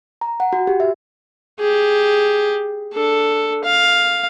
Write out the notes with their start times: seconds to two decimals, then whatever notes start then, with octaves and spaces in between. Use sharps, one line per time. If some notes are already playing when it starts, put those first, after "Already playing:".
0.21 A#5
0.40 F#5
0.53 F#4
0.67 G4
0.80 E5
1.59 G4 G#4
2.93 D4 A4
3.64 F5